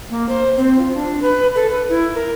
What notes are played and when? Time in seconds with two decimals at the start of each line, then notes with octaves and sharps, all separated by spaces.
0.10 A#3
0.29 C5
0.57 C4
0.79 F4
0.95 D4
1.22 B4
1.55 A4
1.70 B4
1.89 E4
2.15 A#4